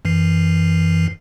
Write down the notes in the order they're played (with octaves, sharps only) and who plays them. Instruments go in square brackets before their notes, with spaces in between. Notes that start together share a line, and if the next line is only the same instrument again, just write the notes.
[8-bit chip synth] F#2 E3 C7